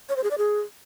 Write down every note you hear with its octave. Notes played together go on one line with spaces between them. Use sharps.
C#5
C5
G#4
D5
G#4